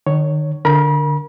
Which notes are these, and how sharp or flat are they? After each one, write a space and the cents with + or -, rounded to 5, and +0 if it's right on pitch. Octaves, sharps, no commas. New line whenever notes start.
D#3 -35 C#5 +0
D3 +0 A#4 +0 B5 -40